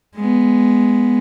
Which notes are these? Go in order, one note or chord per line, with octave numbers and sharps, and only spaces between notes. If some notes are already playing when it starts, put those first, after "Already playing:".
G#3 B3